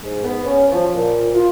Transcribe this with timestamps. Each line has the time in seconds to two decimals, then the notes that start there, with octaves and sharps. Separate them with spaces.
0.03 G#2
0.22 B3
0.45 C#4
0.72 F3
0.94 A#2
1.33 F4